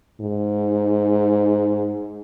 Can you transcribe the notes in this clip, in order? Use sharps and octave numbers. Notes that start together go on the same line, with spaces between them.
G#2